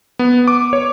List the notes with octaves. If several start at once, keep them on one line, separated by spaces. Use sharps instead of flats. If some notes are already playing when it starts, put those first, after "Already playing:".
B3
D6
C#5